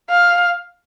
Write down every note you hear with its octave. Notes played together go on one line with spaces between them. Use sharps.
F5